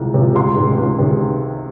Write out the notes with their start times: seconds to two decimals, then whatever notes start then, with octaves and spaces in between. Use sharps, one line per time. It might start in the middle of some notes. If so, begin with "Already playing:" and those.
Already playing: C2 C3 F3 G#3
0.14 C3 F3 G#3
0.35 C#2 C6
0.56 C3 D#3 G#3
0.78 C#2
0.99 C3 D#3 G#3